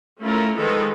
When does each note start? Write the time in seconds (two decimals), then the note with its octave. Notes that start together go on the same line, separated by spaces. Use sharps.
0.21 A3 C#4 E4 F4 A#4
0.57 D#3 F3 G#3 A4 B4